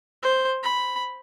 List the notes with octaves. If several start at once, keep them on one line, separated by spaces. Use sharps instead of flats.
C5
B5